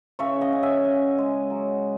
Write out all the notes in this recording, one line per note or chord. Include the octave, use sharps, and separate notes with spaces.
C#3 C#5 E5
D#5 F#5
C#4
E5 G#5
C#4 D#5 F#5
G#3
F#3